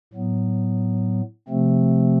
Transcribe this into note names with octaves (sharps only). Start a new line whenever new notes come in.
A2 F#3 B3
C3 F3 A3 C4